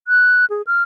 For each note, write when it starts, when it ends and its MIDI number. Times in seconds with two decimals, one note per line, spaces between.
0.08 0.45 90
0.50 0.62 68
0.67 0.83 89